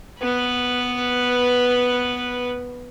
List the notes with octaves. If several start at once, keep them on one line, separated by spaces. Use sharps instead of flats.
B3 B4